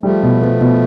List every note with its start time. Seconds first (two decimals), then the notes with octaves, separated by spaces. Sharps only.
0.03 F3 G3 A3
0.23 B2
0.42 B3
0.61 B2